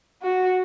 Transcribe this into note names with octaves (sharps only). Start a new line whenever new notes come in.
F#4